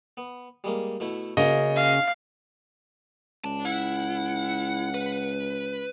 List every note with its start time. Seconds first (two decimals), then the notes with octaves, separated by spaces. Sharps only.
0.17 B3
0.64 G3 G#3 A#3
1.00 B2 A3 E4
1.37 C#3 A#3 F#4 D#5
1.76 F5
3.44 C#2 D5 A5
3.65 E4 F#5
4.94 B4